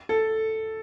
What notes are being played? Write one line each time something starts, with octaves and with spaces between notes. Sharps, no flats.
A4